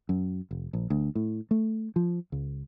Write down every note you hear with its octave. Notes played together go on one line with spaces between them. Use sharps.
F#2
F1
A#1
D2
A2
A3
F3
C#2